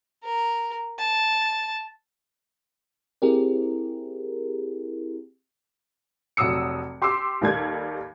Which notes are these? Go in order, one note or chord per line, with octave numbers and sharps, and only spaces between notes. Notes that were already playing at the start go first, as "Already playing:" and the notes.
A#4
A5
C4 E4 G4 G#4 A#4
F1 F#3 D#6 E6 C#7
G4 C6 D6 E6
D#2 D#3 G3 A4 G#6